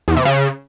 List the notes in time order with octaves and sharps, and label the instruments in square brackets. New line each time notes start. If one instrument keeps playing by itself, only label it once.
[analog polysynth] E2
C3
C#3